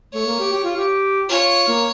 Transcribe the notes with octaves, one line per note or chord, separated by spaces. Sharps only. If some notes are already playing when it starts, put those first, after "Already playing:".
A3 C#5
A#3
G4
G4
F4
G4
F4 C#5
A#3